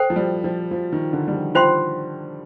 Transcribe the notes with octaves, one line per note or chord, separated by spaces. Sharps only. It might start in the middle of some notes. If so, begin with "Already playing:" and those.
Already playing: A4 C5 G5
F3
G3
F3
F3
D#3
D3
G3
F3
F4 C5 G5 C6